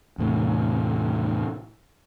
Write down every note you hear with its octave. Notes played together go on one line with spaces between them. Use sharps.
E2 A2 C3